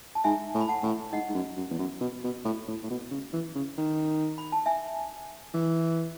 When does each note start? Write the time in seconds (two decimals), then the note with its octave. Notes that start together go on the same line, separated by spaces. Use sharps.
0.15 A5
0.24 G#2 E5 G#5
0.54 A2
0.61 B5
0.68 F#5 A5
0.83 A2
1.12 G#2 D#5 F#5
1.29 G#2
1.35 F#2
1.57 F#2
1.71 E2
1.79 F#2
2.01 B2
2.24 B2
2.45 A2
2.68 A2
2.83 A2
2.90 B2
3.11 C#3
3.33 E3
3.55 C#3
3.78 D#3
4.38 B5
4.52 A5
4.66 E5 G#5
5.54 E3